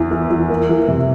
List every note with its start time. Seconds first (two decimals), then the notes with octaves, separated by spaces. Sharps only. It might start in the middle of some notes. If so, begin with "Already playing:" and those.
Already playing: E2 E3
0.11 E3
0.31 E3
0.50 A#3
0.69 E3
0.88 C3